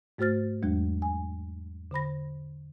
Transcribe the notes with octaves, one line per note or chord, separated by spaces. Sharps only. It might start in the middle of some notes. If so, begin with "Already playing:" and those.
G#2 A3 F#4 C5 F6 A6
E2 F#3 G#3 D4
G#5
D3 C5 B5 A#6